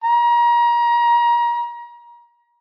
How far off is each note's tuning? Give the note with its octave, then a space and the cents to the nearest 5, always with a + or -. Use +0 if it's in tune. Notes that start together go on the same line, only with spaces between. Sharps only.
A#5 +30